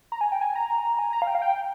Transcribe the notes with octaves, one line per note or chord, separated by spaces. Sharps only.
A#5
G#5
G5
G#5
A#5
G#5
A#5
F5
G5
F5
G5